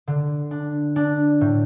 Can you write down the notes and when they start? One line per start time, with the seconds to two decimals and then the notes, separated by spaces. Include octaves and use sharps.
0.07 D3
0.51 D4
0.96 D4
1.41 A2